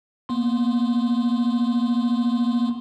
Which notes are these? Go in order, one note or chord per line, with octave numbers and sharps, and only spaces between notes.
A#3 B3 C6